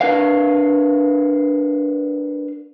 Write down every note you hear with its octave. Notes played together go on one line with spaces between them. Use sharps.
D4 A#4 B4 F5